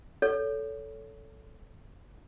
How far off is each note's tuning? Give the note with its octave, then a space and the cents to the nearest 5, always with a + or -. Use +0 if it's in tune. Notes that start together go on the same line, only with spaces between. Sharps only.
A4 +0 C#5 +25